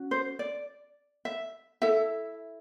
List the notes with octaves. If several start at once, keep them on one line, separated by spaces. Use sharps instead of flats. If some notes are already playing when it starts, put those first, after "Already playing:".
Already playing: C#4 F#4
C5
D5
E5
E4 A4 E5